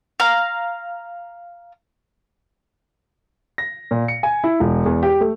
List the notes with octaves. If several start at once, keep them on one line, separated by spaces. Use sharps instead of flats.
F5 A#5
A#6
A#2
C#7
G#5
E4
E1
E2
G4
A3